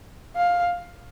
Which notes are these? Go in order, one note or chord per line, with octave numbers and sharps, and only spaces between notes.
F5